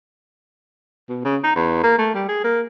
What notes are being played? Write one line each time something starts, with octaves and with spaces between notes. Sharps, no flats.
B2
C#3
D#4
E2
A#3
A3
G3
G#4
A#3